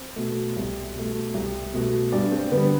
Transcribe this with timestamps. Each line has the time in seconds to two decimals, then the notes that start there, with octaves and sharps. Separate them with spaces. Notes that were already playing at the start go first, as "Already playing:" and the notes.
Already playing: C4
0.16 B2 A3
0.56 C2
0.95 B2 A3
1.34 C2
1.74 B2 A3
2.12 G2 D4 D5
2.32 C4 C5
2.51 D3 G3 B3 B4